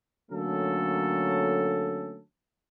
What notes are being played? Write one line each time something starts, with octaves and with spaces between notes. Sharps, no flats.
D3 F#3 A3 A#3 C#4 A4